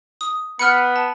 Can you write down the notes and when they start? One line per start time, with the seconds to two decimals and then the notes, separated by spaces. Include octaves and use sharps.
0.21 D#6
0.59 B3 B5 F6 F#6 C#7
0.96 A5